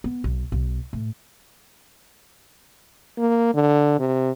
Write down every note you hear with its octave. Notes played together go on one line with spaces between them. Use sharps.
B3
B1
B1
A2
A#3
D3
C3